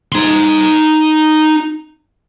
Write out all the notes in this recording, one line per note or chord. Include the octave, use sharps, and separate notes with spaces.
D#4 C6